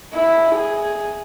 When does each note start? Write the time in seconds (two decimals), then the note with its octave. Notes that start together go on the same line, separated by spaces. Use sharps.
0.14 E4
0.54 G#4